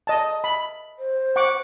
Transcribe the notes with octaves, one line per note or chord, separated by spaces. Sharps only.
D#5 A5
B5
C5
F#5 C#6 D6